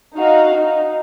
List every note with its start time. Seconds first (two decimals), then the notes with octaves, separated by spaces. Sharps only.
0.15 D#4 F#4 F5
0.54 D#4